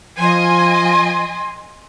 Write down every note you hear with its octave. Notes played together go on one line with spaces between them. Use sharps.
F3 D#5 G#5 C6